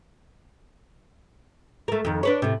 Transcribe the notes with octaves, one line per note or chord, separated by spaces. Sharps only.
A3 A#4
F2 D#3
D4 B4 C#5
A2 C3